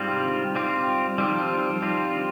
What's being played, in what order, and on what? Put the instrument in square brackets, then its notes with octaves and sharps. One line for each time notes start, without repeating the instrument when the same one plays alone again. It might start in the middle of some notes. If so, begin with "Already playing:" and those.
Already playing: [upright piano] G#2 [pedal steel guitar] G3 C4 F4
[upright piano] C3
D#3
D3
D#3
[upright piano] D#3 [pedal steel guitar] G3 C4 F4
[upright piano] D#3 [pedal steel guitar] G3 C4 F4
[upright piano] F3
D#3
F3
F3
[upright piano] D#3 [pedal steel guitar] G3 C4 F4
[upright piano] D3